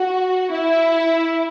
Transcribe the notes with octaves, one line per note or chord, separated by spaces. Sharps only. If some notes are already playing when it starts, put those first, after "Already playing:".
Already playing: F#4
E4